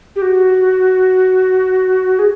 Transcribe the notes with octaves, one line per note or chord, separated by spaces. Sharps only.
G4
F#4
G#4